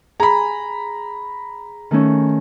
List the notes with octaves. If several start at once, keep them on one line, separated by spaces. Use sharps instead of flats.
G#4 A#5 B5
D#3 A3 C#4